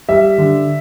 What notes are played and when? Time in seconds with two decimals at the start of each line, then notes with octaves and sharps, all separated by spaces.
0.09 G3 E5
0.38 D3